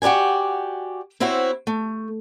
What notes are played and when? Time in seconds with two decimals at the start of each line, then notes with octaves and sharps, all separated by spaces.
0.02 F#4 G4 B4 D5 G#5
1.20 C4 E4 F#4 C5 C#5
1.67 A3